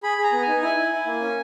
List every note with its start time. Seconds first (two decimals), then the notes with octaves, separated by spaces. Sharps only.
0.03 G#4 B5
0.18 G#4
0.24 A#5
0.32 B3
0.42 G#5
0.48 D#4
0.62 E4 G#5
0.77 E4
0.92 E4
1.06 A#3
1.21 C#4